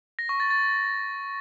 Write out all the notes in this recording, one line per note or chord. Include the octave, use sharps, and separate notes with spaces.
A#6
C#6
A6
A6